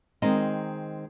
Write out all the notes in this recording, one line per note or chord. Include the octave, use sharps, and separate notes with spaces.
D#3 G#3 C4 D#4 D#5